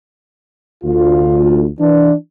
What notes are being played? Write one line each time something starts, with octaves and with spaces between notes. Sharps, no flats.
D2 F4
E3 D4